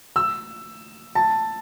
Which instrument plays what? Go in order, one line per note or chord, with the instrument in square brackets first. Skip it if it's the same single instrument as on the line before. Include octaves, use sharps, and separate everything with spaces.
[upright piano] E6
A5